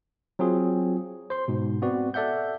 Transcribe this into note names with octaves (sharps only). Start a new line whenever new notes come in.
F#3 C4 F4 G#4
C5 C6
G#2 B2
B3 C4 F#4 D5
A4 D5 E5 F#5 G6